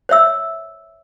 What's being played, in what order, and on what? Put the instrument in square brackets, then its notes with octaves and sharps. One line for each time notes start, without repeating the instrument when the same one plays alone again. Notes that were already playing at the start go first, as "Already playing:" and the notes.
[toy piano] C5 C#5 E5 E6